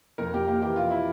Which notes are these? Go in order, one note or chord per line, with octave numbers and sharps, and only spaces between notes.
F2 A#4
F2 G4
A#3 G4
E3 G4
F2 F4
E4